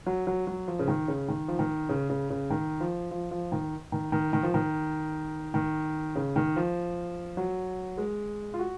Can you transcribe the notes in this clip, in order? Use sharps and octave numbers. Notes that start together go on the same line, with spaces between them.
F#3
F#3
F#3
F3
C#3
D#3
C#3
D#3
F3
D#3
C#3
C#3
C#3
D#3
F3
F3
F3
D#3
D#3
D#3
D#3
F3
D#3
D#3
C#3
D#3
F3
F#3
G#3
F4
F#4